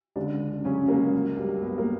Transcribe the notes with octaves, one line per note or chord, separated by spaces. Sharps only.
C#2 D3 D4
C#3
C#3 F#3 C#4
C#2 A#3
F#3
G2
G2 B3
A#3